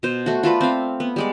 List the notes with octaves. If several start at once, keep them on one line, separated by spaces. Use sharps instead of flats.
B2 C5
A3 F#4
F4 A4 B4 D5
C4 E5 F5
B3
G3 G#3 D5